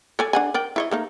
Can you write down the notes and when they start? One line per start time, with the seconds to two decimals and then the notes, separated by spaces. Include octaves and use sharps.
0.19 A4 D5 G#5
0.33 D4 F#5 G#5
0.54 A#4 D5 G5
0.76 E4 C#5 D#5
0.91 A3 A#3 D#4